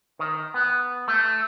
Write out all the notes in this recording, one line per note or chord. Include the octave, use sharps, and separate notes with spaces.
D#3
B3
A3